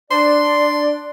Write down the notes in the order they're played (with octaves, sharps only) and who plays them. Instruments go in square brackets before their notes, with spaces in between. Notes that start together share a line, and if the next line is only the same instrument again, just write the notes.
[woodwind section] D4 D5 [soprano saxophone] C6